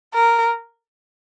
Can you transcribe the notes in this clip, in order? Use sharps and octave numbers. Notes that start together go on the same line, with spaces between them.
A#4